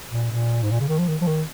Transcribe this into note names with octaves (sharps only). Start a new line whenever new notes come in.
A#2
A#2
G#2
A#2
C#3
D#3
F3
D#3
F3
D#3